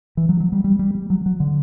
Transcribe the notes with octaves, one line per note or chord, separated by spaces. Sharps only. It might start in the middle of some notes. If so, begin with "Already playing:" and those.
E3
F#3
F#3
G3
G3
G3
G3
F#3
F#3
D3